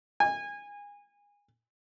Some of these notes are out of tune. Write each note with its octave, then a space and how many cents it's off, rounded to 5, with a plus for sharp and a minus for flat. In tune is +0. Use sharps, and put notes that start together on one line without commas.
G#5 -25